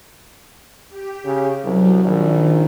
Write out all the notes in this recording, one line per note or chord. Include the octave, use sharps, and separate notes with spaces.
G4
C#3
C2 F#3
A#1 D#3